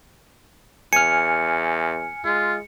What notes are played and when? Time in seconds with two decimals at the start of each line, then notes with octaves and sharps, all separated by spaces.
0.93 E2 G#5 F6 C#7
2.25 G#3 F4